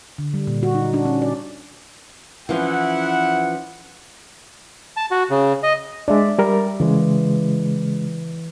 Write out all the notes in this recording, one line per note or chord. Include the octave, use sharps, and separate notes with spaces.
D3
G3
A#2
F#4
D#4
D4
C#4
D5
E3 F3 C#4 E4 F#5
A5
F#4
C#3
D#5
G#3 D4 D5 E5
G3 A#4
C#3 E3 G#3